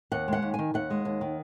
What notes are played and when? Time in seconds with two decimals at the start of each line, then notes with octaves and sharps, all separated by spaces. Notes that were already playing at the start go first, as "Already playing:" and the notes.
0.12 D#2 F#5
0.28 G#3 F#5
0.42 D#2
0.54 D#3 G#5
0.74 D#2 F#5
0.90 G#3
1.05 D#2
1.21 D#3